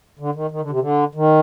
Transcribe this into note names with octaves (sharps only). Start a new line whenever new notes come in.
D3
D#3
D#3
D3
C3
D3
D#3